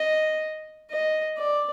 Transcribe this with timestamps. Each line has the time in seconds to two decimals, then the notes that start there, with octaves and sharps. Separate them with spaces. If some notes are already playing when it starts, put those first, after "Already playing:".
Already playing: D#5
0.92 D#5
1.38 D5